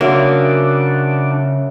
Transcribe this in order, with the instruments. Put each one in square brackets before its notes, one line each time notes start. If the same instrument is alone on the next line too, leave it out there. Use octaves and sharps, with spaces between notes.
[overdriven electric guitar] C#3 [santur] F#3 E5 C6 [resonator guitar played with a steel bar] A#3 [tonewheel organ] D4